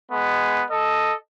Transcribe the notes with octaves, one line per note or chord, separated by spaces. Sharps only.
G#3 B3
A4 D#5